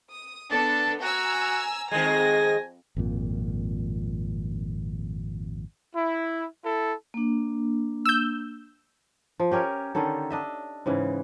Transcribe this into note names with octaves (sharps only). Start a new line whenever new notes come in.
D#6
B3 D4 A4 A5
F#4 G#5 A#5 E6
F2 D#3 G#3 G#5 A#6
G#1 F2 A#2
E4
E4 A4
A#3 D4
E6 G6
F3
C#4 G4 A#4 C#5
D3 D#3 C#4 A4
D4 D#5 E5
G#2 C#3 E3